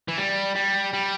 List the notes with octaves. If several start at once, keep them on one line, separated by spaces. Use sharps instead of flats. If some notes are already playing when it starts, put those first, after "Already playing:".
E3
G3
G3
G3